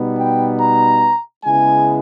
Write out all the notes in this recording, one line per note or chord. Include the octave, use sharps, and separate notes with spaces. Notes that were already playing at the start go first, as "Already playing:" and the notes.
Already playing: B2 G3 B3 D#4
G5
A#5
C#3 G#3 B3 E4 G#5